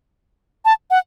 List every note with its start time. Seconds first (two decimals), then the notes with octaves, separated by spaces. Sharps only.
0.65 A5
0.91 F#5